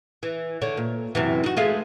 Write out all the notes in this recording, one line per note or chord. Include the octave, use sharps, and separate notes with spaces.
E3
D3 C#5
A#2
F#2 C3 E3
D#4 F#4
G#3 A3 F4